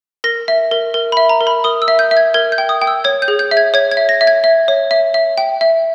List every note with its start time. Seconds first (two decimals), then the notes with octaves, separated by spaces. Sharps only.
0.24 A#4 A#6
0.48 E5
0.72 A#4
0.94 A#4
1.12 E5 B5
1.29 A#5
1.41 A#4
1.47 B5
1.64 A#4 D#6
1.82 E6
1.88 E5
1.99 G6
2.11 E5
2.17 G#6
2.34 A#4 G#6
2.52 G6
2.58 G5
2.69 D#6
2.81 G5
2.87 E6
3.04 C#5 G#6
3.22 G6
3.28 G#4
3.39 G6
3.51 E5
3.57 G#6
3.74 C#5 G#6
3.91 G#6
3.97 E5
4.09 A#6
4.21 E5
4.27 G#6
4.44 E5
4.68 C#5
4.91 E5
5.14 E5
5.38 G5
5.61 E5